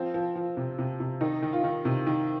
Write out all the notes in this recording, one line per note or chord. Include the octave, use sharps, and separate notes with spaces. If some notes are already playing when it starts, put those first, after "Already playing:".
Already playing: F3 C4
F3
F3
C3
C3
C3
D#3 D#4
D#3
F4
D#3
C3
D#3